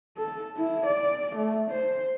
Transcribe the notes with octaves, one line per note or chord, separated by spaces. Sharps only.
A4
E4
D5
A3
C5